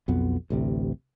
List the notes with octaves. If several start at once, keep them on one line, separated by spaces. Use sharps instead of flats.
B1 F2 B3
A1 D2 C3